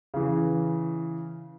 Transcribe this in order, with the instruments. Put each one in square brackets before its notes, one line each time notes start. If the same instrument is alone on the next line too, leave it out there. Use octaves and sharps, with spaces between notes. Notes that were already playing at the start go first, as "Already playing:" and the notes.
[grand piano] C#3 E3